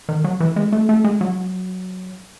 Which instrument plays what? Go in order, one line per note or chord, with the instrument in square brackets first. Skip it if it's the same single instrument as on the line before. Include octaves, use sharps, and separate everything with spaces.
[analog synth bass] D#3
F#3
E3
G#3
A3
A3
G#3
F#3